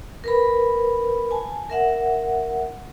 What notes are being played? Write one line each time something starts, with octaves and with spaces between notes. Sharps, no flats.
A#4 B4 B5
G#5 A5
A#4 E5 F#5